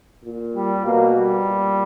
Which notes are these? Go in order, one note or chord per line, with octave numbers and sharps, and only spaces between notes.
A#2
G3
B2 A#3
G3
A#2